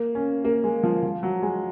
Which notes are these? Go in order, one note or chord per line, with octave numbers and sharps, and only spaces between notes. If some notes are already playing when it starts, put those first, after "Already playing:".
Already playing: A#3
C#4
A#3
G#3
F3
F3
F#3
G#3